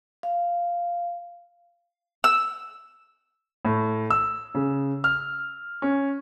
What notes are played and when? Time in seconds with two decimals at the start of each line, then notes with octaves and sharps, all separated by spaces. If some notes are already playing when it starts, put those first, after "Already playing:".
0.23 F5
2.24 E6
3.65 A2
4.10 E6
4.55 C#3
5.04 F6
5.82 C#4